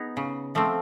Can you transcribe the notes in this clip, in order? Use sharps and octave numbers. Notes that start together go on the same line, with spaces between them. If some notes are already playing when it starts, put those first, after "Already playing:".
Already playing: B3 D#4 G#4
C#3
F3 A3 C4